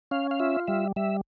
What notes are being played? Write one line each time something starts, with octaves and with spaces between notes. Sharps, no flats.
C#4 F5
F5
F4 E5
G3 E5
G3 E5